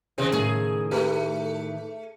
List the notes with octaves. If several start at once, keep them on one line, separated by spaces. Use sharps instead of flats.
D#2 C#3 C4
A2 D#3 G#4
A3 G4 B4